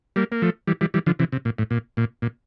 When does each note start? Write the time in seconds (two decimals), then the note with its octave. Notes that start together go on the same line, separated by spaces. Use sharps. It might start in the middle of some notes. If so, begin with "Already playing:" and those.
0.16 G3 A#3
0.32 A#3
0.42 F3 A3
0.67 E3 G3
0.81 E3 G3
0.94 E3 G3
1.06 D3 F3
1.19 C3 E3
1.32 C3
1.45 A#2
1.59 A2
1.71 A#2
1.97 A#2
2.22 A#2